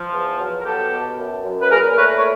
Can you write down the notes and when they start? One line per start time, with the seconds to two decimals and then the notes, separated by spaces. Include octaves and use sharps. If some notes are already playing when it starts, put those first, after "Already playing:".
Already playing: F3
0.12 E2
0.39 F#3
0.59 A#4
0.65 B3 G4 A4
0.91 B2
1.17 F#2
1.44 F#2
1.61 B4
1.70 A#2 G#4 A#4
1.97 A3 B4 C#5
2.17 C#5